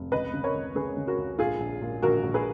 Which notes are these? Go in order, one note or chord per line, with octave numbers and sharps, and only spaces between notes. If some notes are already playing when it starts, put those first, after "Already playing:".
Already playing: F1
C#2 B4 D#5
C#3
A#4 C#5
C#2
C#3 G#4 B4
C#3
F#4 A#4
C#2
A#1 F4 G#4
A#1
A#2
A#1 F#4 A#4
A#1
G#4 B4